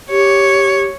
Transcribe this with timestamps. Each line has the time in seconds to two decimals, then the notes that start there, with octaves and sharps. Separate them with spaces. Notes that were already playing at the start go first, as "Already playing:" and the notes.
0.10 G4 C#5